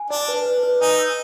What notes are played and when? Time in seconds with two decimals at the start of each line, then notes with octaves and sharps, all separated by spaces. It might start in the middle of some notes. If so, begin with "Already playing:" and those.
Already playing: G#5
0.10 D4 D5
0.28 B4
0.45 B4
0.63 B4
0.81 D#4 G#5
0.99 E6